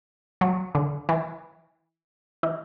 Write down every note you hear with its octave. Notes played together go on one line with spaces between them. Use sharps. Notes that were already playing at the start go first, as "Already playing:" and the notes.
F#3
D3
E3
E3